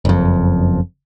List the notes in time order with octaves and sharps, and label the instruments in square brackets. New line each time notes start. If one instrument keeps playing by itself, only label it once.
[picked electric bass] F#1 F2